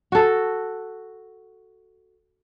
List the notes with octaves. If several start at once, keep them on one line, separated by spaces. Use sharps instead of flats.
F#4 A4